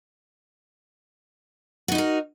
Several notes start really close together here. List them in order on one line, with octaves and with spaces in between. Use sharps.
F#4 D#4 E4 A#4